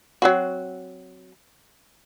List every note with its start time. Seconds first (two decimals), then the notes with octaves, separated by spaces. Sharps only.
0.22 F#3 C4 F#4